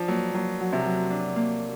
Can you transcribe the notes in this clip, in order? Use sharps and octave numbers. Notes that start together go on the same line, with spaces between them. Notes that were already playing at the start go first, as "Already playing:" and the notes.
Already playing: F3 D4
F#3 A#3
F#3 A#3
F#3
C3
F#3
D4
A#3